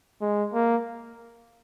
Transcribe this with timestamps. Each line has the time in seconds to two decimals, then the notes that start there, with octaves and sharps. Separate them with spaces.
0.21 G#3
0.54 A#3